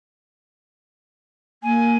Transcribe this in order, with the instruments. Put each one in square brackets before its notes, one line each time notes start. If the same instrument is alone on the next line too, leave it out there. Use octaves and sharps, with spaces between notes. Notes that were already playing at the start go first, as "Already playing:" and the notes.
[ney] A#3 [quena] G#5